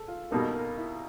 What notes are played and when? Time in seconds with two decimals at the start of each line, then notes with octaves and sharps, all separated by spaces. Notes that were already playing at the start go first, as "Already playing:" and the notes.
Already playing: G#4 A4
0.08 F4
0.31 B2 G3 A#3 D#4 A4
0.54 A#4
0.77 E4